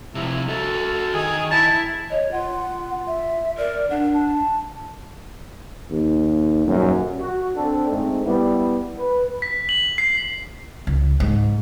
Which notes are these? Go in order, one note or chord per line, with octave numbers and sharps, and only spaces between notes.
C3 F3 E4
F#4 A4 E5
D#3 G#4
E4 A5
C#5 D#5
F4 F#5
E5
A#4 D5
D4 F#5
A5
D#2
D#1 F#2
F#4
C4 D4 A4
G#2 G#3 A3 C4
G3 B3 E4
B4
B6
F#7
C7
C#2
G#2